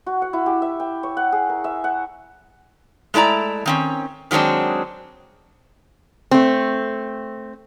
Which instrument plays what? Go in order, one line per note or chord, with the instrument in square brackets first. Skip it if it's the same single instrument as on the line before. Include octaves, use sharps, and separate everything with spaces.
[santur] F#4
F#5
E4
G4
E5
G5
C#5
F#5
G#4
A#4
E5
F#5
[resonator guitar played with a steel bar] G#3 A3 E4 D5 A#5
D#3 C4 C#4
D#3 F#3 G#3 C4 D4
A3 C4